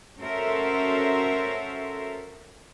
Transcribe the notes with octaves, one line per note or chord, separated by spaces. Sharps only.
C#4 F#4 A4 A#4 C5 E5